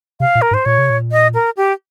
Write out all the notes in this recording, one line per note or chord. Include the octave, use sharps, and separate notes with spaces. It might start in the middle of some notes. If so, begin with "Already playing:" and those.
C3 F5
A#2
A#4
G#2
C5
A#2 C#5
C3
A#2
D#5
A#4
G4